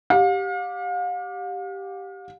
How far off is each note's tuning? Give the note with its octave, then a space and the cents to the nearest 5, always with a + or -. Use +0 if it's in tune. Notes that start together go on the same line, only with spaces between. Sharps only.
G4 +0 F5 +40